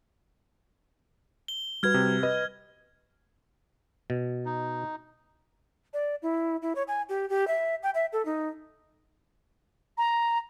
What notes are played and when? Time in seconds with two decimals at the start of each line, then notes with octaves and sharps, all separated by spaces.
1.48 G7
1.83 G3 F#4 B4 F6 G#6
1.94 C3
2.23 B4 D#5
4.10 B2
4.45 D#4
5.94 D5
6.22 E4
6.62 E4
6.76 C#5
6.88 G#5
7.09 G4
7.30 G4
7.48 E5
7.83 G5
7.95 E5
8.13 A4
8.25 D#4
9.98 A#5